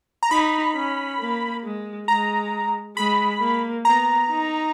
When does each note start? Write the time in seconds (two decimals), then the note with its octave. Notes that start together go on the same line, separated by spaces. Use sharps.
0.23 A#5
0.31 D#4 B5
0.76 C#4
1.20 A#3
1.64 G#3
2.08 G#3 A#5
2.96 G#3 B5
3.41 A#3
3.85 B3 A#5
4.30 D#4